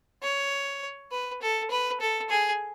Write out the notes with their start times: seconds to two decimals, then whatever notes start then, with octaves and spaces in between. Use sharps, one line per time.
0.23 C#5
1.11 B4
1.42 A4
1.70 B4
2.00 A4
2.29 G#4